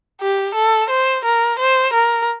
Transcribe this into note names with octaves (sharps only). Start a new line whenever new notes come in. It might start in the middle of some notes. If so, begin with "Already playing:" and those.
G4
A4
C5
A#4
C5
A#4